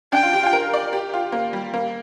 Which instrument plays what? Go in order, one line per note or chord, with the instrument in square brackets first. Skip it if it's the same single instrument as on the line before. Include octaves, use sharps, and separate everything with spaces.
[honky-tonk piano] D4 [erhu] G5
[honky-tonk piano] F4
G4
F4
A#4
D5
G4
F4
A#3
G3
A#3